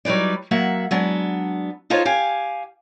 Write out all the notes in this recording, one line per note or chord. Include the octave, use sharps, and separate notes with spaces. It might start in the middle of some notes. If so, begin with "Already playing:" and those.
F#3 G3 D#4 B4 D5
F#3 A#3 E5 F#5
F#3 G#3 B3 D4
D#4 F4 A4 C5 C#5 D#5
G4 F5 G#5